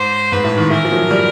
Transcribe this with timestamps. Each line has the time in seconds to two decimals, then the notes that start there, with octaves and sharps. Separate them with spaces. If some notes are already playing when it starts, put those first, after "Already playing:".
Already playing: G#2 C5
0.32 G#2 B4
0.44 A2
0.58 D#3
0.70 E3 A#4
0.85 F3
0.91 F#3
0.97 F3
1.11 G3